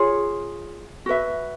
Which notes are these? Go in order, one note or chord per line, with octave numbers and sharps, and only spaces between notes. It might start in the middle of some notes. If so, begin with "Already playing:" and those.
Already playing: F4 G#4 C#5
F#4 B4 E5